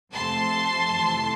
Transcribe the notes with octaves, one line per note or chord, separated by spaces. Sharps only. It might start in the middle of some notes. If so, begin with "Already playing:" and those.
F2 C3 F3 A3 A5 C6
F2 C3 E3 A3